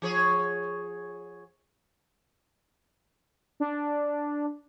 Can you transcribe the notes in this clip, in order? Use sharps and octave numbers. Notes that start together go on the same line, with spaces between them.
F3 G#4 C#5
D4